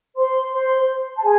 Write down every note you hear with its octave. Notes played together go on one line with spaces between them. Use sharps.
C5 C6
C5 C6
A5
G#4 G#5